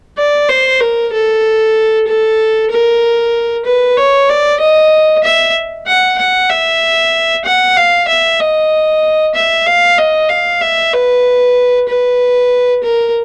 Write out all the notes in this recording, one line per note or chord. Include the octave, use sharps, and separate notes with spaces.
D5
C5
A#4
A4
A4
A#4
B4
C#5
D5
D#5
E5
F#5
F#5
E5
F#5
F5
E5
D#5
E5
F5
D#5
F5
E5
B4
B4
A#4